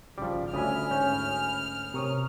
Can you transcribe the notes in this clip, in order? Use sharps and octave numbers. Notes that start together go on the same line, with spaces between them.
G#1 C#3 F3 G3 D6
D2 C#4 F#4 E5 G#5 B5 D#6 F6
G#2 C#4 G6
C3 A#4 C#5 C#6 D#6